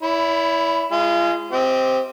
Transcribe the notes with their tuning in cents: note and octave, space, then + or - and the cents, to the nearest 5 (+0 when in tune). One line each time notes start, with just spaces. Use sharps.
E4 +0 C#5 +45 B5 +25
G#3 +0 F4 -30 G#4 +0
C4 +0 G4 +0 D#5 +20